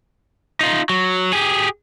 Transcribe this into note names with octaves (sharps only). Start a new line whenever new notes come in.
D#4 F4
F#3
G4 G#4